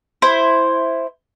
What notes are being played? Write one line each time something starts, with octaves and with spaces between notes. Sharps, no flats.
E4 C5